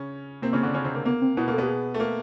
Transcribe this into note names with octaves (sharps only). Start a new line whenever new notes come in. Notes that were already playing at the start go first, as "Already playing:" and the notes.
Already playing: C#3 C#4
C3 A#3 C4
C#3 C#4
D3 D4
C#3 C#4
C3 C4
A#3
A#3 B3
C4
B2 B3 E4
A#3
A4
B2 B3 G4
G#4
A3
A#3